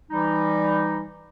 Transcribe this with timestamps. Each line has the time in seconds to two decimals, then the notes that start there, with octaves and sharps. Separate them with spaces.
0.10 E3 G3 D#4